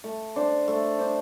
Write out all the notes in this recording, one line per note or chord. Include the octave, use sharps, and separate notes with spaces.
A3
D4 C5
A3
D4 C5